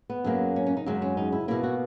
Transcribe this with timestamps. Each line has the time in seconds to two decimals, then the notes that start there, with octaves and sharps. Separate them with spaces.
0.10 B3
0.24 F#2 C#3 F#3 A#3
0.56 C#4
0.66 C#4
0.77 D#4
0.86 F#2 C#3 G#3
1.02 C#4
1.17 D#4
1.32 E4
1.48 B2 A#3 E4
1.63 F#4